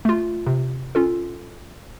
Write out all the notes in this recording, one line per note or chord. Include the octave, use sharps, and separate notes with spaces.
A3 F4
C3
C#4 F4 A4